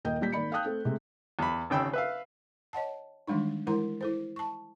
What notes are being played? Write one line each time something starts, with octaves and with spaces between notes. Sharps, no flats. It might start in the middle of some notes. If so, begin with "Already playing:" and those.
D#1 A#3 D#5 G5 G6
A#2 G3 G6 B6
G#1 A#3 D5 B5 C#7
F5 G5 A5 D#6 F#6 G6
A3 C4 A4
C3 G#3 A3
E2 B5
G#1 C#3 G5 B5 E6
B4 E5 F5
C#5 D#5 F#5 A5
D#3 E3 G3 G#3 D4 D#4
E3 G#3 E4 A#4 A#5 C6
E4 A4 C5
A5 C#6